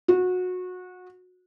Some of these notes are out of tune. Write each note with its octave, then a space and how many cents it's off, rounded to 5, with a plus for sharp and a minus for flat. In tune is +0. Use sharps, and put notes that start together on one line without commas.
F#4 -25